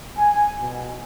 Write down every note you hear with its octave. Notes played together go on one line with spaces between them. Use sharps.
G#5
B2